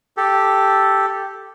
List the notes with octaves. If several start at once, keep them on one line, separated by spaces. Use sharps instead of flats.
G4 A4